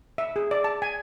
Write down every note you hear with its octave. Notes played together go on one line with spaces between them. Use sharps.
E5
G#4
D5
A5
G#5